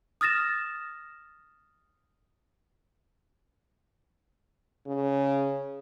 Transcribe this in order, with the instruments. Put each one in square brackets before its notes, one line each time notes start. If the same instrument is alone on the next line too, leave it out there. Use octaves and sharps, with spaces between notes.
[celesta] D#6 F6 A6 A#6 E7
[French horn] C#3